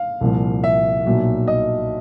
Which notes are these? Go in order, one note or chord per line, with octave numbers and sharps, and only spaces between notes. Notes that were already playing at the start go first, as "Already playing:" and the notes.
Already playing: F5
C2 A#2 F3
E5
B1 A#2 F#3
D#5